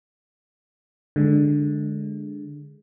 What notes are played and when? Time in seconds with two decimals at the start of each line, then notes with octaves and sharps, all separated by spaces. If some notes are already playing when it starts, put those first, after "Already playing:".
1.16 D3 G#3